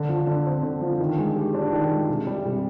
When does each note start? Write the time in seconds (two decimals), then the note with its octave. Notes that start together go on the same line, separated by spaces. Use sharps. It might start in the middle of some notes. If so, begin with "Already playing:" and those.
Already playing: D3
0.09 F3
0.27 D3
0.46 C4
0.63 D3
0.81 F3
1.00 D#3
1.18 G#3
1.36 G4
1.54 D4
1.73 D#3
1.90 G#3
2.08 C3
2.27 G3
2.45 C3